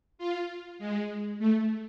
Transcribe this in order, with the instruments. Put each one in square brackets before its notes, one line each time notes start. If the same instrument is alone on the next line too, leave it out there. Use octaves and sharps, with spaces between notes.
[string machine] F4
G#3
A3